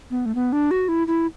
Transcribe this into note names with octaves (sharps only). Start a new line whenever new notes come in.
B3
A3
B3
D4
F#4
E4
E4